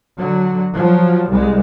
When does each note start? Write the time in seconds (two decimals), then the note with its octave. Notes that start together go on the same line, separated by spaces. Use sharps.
0.19 D3 F#3
0.76 F3 F#3
1.28 C2 G#3